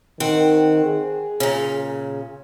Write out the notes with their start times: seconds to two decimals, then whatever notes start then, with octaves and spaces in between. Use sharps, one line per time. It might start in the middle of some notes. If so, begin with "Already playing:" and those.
0.20 D#3 C4 F#5
0.85 G#4
1.40 A#2 C#3